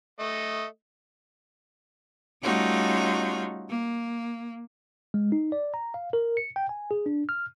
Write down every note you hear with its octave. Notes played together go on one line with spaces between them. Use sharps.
A3 D#5
G3 A3 C#4 D#4 F4 F#4
A#3
G#3
D#4
D5
A#5
F5
A#4
C#7
G5
G#5
G#4
D4
F6